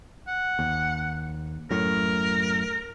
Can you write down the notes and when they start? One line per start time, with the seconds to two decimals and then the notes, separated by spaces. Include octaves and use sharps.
0.28 F#5
0.59 D#2
1.71 F#2 A2 A#4